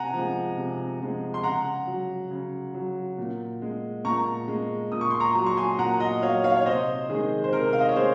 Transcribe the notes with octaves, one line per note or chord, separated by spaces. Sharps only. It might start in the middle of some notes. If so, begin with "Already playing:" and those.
Already playing: C3 F#5 G#5 A#5
F3 G#3
C3
F3 G#3
C6
C#3 F#5 A#5
F#3
C#3
F#3
A#2
G#3
A#2 A#5 C#6
G#3
A#2 D#6
C#6
C6
A#5 C#6
F#3 C6
C#6
G#5 C6
A#2 F#5 A#5
D#5 F#5
F#3 C#5 F5
C#5 F5
C#5
C3 C5 D#5
D#3 G#3 G#4
C5
C3 A#4
F5
D#5
C#5
G#3 G#4 C5